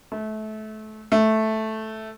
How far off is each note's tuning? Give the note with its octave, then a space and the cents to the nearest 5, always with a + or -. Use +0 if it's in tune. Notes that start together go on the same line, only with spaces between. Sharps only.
A3 -25
A3 -5